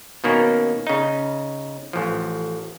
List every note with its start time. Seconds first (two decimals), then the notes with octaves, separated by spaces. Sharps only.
0.24 B2 D#3 A#3 C#4
0.87 C#3 D#4
1.93 A1 F3